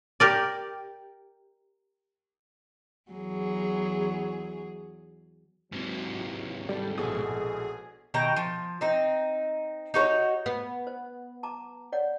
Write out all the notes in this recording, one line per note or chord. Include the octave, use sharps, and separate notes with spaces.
G4 A#4 D5
E2 F#3 G#4
G#2 C3 E3 F#3
E3 G3 G#3 A4
A#1 B2 G#4
B2 D#3 G5 A#5
F3
C4 D#4
D#4 F#4 B4 C#5
B3
C5
A5 A#5 D6
C#5 D5 F#5